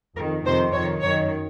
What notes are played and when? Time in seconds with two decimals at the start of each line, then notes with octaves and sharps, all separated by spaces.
0.17 F2 A#4
0.22 D#3
0.46 F2 C3 D#3 C5
0.74 F2 D#3 C#5
1.02 F#2 C#5
1.06 D#3